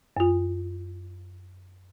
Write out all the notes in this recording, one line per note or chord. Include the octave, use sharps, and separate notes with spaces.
F#2 F4